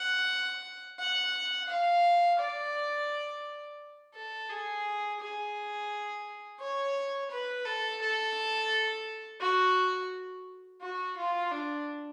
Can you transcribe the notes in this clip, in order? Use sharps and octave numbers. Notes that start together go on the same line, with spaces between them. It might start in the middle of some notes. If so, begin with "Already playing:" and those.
Already playing: F#5
F#5
F5
D5
A4
G#4
G#4
C#5
B4
A4
A4
F#4
F#4
F4
D4